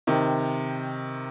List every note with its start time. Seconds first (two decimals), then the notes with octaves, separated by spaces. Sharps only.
0.07 C3 D#3